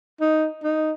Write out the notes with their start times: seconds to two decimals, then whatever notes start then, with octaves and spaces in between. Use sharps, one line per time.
0.21 D#4
0.63 D#4